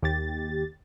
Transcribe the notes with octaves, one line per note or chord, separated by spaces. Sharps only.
D#2 G4 A6